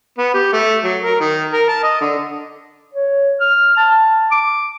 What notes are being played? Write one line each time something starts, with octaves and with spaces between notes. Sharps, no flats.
B3
G4
A3
F#3
A#4
D#3
A#4
A5
D#5
D3
C#5
F6
A5
D6